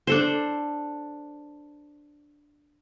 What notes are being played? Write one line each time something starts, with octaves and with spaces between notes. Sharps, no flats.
D4 A4 C5